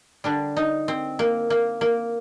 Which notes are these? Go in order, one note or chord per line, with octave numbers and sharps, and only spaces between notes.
D3 G3 D4
D#4
C4
A#3
A#3
A#3